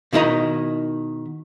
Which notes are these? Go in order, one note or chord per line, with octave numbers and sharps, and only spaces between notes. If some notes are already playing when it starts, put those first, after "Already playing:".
B2 D#3 E4 F#4 D#5 A#5